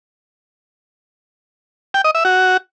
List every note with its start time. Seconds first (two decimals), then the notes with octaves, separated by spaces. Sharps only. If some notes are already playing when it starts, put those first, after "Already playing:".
1.94 G5
2.04 D#5
2.15 E5
2.25 F#4